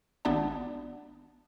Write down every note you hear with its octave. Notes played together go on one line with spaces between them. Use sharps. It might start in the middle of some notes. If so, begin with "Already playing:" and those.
G#1 B3 D4 D5 A5